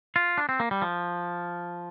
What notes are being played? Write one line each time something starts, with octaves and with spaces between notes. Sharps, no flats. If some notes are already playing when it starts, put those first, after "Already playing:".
F4
D4
C4
A#3
G3
F3